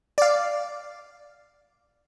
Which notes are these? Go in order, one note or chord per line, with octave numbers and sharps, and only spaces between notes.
D5 F5